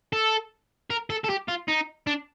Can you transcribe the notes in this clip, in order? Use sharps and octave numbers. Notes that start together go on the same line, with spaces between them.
A4
A#4
A4
A4
G4
F4
D#4
D4